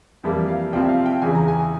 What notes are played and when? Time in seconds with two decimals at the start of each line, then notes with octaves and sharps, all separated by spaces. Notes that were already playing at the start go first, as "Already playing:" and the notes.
0.23 F2 E3 G3 A#3 E5
0.48 F5
0.72 C2 C3 F3 C4 G5
0.84 E5
0.89 F5
1.06 G5
1.21 E2 C#3 E3 G#5
1.35 A#5
1.48 G#5